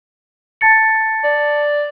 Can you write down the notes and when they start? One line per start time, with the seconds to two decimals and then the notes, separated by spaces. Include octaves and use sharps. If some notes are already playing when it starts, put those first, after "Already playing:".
0.61 A5 A6 C#7
1.24 D5